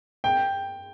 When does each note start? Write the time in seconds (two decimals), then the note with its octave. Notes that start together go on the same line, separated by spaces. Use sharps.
0.24 G5